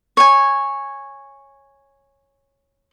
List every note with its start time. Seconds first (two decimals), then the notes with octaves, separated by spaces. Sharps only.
0.17 C#5 G#5